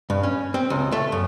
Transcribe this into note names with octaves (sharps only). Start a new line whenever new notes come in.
G2
C#4
C4
C#2
A3
F#2